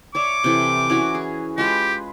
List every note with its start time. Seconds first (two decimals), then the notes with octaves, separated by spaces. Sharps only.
0.15 C#5 D5 E5 D6
0.44 C3 E3 A4
0.90 E3 C#4 F#4
1.15 G#4
1.58 G#3 F4 G4 B4